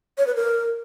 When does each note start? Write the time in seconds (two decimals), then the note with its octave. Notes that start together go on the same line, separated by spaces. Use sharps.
0.18 C#5
0.27 B4
0.36 A#4